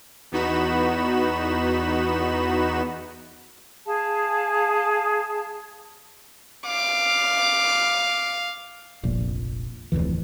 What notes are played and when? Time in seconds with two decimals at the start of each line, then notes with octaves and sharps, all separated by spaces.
0.32 E2 B3 D#4 F#4 B5 E7
3.86 G#4 F5 A5
6.66 F5 D6
9.03 F1 A#1 A#2
9.92 D1 A1 F2 E3